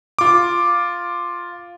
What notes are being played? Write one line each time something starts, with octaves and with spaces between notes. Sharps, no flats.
F4 D6